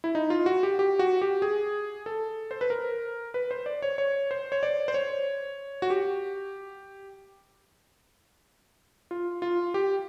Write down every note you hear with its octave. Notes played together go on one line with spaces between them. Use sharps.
E4
D#4
F4
F#4
G4
G4
F#4
G4
G#4
A4
C5
B4
A#4
B4
C5
D5
C#5
C#5
C5
C#5
D5
C5
C#5
F#4
G4
F4
F4
G4